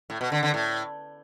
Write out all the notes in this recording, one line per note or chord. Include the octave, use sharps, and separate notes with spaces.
A2
B2
D3
D3
A2